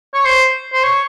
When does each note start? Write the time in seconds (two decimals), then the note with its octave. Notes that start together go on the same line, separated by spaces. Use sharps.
0.14 C#5
0.25 C5
0.73 C5
0.84 C#5